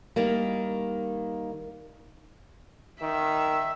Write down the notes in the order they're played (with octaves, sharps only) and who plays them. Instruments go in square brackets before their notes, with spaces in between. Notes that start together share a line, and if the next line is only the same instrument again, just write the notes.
[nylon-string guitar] D#3 G3 A#3
[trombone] D#3 [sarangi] E5